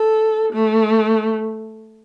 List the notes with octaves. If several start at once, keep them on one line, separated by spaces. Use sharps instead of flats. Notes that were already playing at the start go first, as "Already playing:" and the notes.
Already playing: A4
A3